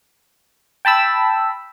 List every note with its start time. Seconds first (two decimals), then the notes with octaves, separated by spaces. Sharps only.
0.85 G5 A5 B5 E6